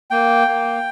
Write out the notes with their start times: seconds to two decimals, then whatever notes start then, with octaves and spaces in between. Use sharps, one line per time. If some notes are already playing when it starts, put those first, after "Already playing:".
0.10 A#3 G5
0.48 A#3